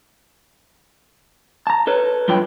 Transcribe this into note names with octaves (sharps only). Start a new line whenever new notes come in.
A5 A#5
A4 B4 C#5
G2 F#3 F4 B4 G5